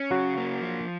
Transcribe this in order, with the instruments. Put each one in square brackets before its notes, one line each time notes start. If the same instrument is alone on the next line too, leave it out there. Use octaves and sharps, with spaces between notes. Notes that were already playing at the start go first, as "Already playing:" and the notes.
Already playing: [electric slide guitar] C#4
[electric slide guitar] C#3 [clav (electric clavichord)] F#3 F#4
[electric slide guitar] A#3
F3